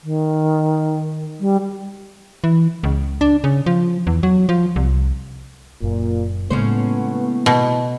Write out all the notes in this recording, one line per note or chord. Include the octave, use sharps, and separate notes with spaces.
D#3
G3
E3
C#2
D4
C#3
F3
E2
F#3
F3
C2
F#1 F#2 A#2
A2 C#3 G#3 A#3 B3 C#4 C5
B2